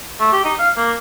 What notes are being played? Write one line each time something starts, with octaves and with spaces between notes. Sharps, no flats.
A3
G4
D#4
F5
A#3